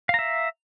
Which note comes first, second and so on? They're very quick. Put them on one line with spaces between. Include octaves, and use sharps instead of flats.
F5 A#5 E5